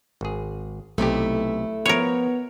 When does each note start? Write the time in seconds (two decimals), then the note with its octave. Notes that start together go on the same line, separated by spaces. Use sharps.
0.21 G#1 G#4
0.98 B1 C3 A3 E4 G4
1.86 F3 B3 A#4 B4 C#5